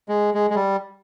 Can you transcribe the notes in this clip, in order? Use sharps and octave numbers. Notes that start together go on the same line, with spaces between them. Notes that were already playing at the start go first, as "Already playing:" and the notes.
G#3
G#3
G#3
G3